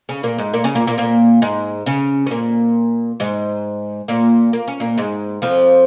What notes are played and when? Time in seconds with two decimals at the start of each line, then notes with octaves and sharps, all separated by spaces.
0.09 C#3 C#4
0.23 A#2 A#3
0.38 G#2 G#3
0.53 A#2 A#3
0.64 C#3 C#4
0.75 A#2 A#3
0.87 A#2 A#3
0.98 A#2 A#3
1.42 G#2 G#3
1.86 C#3 C#4
2.26 C#4
2.31 A#2 A#3
3.20 G#2 G#3
4.08 A#2 A#3
4.53 A#3
4.68 C#4
4.80 A#2 A#3
4.98 G#2 G#3
5.42 F2 F3